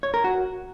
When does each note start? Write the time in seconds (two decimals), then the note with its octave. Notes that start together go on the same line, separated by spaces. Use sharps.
0.03 C#5
0.14 A#4
0.24 F#4